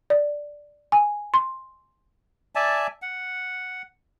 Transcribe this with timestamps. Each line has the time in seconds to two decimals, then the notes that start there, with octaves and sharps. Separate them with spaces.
0.10 D5
0.92 G#5
1.34 C6
2.55 D5 E5 G#5 A5
3.02 F#5